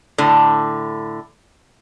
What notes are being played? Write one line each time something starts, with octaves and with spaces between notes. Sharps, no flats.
A2 D3